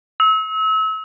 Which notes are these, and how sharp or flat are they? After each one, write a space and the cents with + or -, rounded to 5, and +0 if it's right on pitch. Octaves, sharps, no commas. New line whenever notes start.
E6 -35